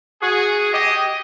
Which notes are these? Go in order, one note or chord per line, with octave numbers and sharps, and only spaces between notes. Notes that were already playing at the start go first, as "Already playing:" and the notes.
F#4 G#4
G4 D#5